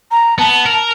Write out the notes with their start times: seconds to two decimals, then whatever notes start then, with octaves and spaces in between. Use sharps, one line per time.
0.11 A#5
0.39 B3 A5
0.66 A#4